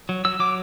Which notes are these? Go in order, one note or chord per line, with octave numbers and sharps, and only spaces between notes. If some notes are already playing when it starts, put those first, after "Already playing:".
F#3
F#3 E6
F#3 D6